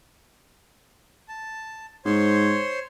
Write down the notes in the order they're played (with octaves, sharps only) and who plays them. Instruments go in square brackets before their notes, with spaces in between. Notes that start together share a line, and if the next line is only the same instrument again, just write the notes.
[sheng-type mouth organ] A5
[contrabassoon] G#2 [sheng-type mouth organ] C5 C#5 C6